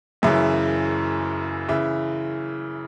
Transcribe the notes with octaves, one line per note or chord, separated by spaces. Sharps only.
F#1 F#2 C#3 E3 E5
C#3 E3 E5